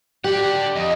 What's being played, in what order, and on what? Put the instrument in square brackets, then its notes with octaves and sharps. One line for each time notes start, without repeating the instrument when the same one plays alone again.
[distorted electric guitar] D4 F#5 [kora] G4
[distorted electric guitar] F2 [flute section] D#5